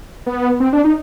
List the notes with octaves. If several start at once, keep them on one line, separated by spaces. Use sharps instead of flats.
B3
C4
D4
D#4